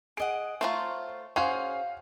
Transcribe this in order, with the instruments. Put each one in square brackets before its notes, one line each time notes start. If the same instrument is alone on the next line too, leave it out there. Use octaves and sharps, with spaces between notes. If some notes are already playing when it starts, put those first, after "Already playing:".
[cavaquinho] G#4 D#5 F#5 [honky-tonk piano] D7
[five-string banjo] A3 F4 [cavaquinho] C5 C#5 A#5
[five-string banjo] C#4 G#4 C5 [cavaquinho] F#4 [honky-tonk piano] F5